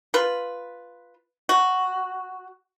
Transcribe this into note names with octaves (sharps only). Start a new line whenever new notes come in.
F4 B4
F#4